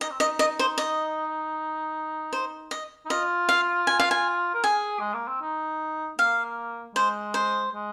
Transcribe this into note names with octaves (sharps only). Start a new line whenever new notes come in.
D#4 D#5
C4
D#4 D#5
D#5
C5
D#5
C5
D#5
D#4
F4 D#5
F5
G#5
F5
G#5
A#4
G#4 G#5
G#3
A#3
C4
D#4
A#3 F5
G#3 C5
C5
G#3